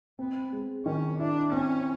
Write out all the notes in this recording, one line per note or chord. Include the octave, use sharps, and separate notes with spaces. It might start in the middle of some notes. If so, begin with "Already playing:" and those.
B3 C4
G#3
D#3 C#4
D4 E4
C4 C#4